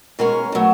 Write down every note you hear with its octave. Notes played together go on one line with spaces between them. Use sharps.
B2 G#3 C#4 A#4
B2 F#3 A3